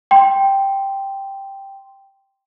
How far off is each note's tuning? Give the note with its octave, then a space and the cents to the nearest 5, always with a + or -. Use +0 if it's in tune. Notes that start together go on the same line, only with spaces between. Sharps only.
G5 +0 C6 +0